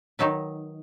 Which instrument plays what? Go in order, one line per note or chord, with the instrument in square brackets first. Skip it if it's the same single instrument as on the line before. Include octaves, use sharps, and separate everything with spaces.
[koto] D#3 F#3 D#4 B4